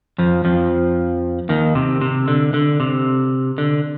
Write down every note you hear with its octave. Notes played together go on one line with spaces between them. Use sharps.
F2 F3
F2 F3
D#2 D#3
C3
C3
D3
D3
C3
D3